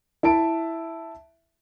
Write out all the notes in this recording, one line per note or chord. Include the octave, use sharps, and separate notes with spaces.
E4 E5 A5 D7